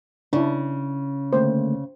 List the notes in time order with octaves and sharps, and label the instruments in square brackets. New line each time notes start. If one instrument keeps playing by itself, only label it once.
[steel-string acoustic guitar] C#3 [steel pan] D4 E4
[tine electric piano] D3 A3 A#3 [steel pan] C5